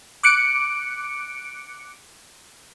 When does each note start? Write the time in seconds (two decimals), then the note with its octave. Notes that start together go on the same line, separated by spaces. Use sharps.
0.23 D6 F#6 C#7 D7